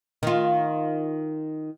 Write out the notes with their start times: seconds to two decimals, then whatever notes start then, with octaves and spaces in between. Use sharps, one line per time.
0.23 D#3 F4